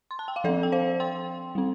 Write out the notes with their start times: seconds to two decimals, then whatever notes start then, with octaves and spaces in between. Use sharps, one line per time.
0.11 C6
0.19 A5
0.28 G5
0.36 F5
0.44 F3 C4 A4 D5
0.63 G5
0.72 C5 F5
1.00 G5 C6
1.55 G3 C4